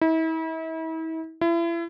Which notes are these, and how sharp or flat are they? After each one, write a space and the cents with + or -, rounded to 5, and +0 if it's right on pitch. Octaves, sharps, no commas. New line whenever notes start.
E4 -40
E4 +35